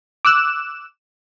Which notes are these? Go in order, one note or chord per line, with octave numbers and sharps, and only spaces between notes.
D6 E6 F#6 E7